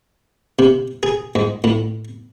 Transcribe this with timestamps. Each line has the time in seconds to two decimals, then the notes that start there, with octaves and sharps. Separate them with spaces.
0.59 C3
1.03 G#4
1.35 G#2
1.64 A2